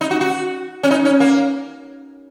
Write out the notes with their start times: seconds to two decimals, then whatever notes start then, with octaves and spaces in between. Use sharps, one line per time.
0.01 D#4
0.11 F#4
0.21 F#4
0.83 C#4
0.91 D#4
1.05 C#4
1.20 A#3